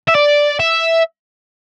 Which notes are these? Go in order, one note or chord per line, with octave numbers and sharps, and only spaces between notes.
E5
D5
E5